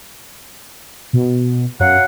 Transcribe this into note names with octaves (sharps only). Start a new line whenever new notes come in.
B2
F#2 F#3 F5 F#5